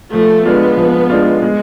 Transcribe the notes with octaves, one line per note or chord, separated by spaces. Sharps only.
F3 A3
G#3 B3 D4 F4
F3
G#3 D4 F4
G#3